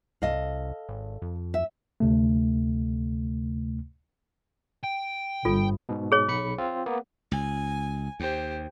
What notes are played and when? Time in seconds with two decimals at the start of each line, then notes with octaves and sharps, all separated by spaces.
0.22 C2 A4 D#5 F5
0.89 G#1
1.22 F2
1.54 E5
2.00 D2 C3 A3
4.84 G5
5.45 G1 F4 A4
5.89 G#2 B2
6.12 G#4 C#5
6.28 B1 B5 C#7
6.58 C4 F4
6.86 A#3 B3
7.32 C#2 G#5
8.20 D#2 G4 C5